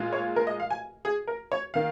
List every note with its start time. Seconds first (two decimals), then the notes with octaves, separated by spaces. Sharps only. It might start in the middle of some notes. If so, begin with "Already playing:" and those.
Already playing: A#2 G#3 F4
0.13 C#5
0.36 A#4
0.47 D#5
0.60 F5
0.70 G#5
1.05 G#4
1.27 A#4
1.52 C#5
1.74 D#3 A#3 F5